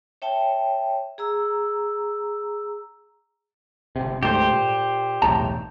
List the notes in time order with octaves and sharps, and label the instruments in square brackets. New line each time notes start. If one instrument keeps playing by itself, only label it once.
[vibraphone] C#5 E5 G5 A5
G#4 A#5 E6
[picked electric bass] G1 C3
[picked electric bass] D2 G#2 A3 [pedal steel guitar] G4 C5
[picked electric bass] A#2
[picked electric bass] B1 E2 A2 [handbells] A5 A#5